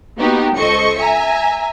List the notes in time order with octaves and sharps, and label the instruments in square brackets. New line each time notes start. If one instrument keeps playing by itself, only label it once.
[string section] A#3 B3 D#4 F#4 G4
C#2 A4 C5 D#5 C#6 C#7
E5 G#5 A#5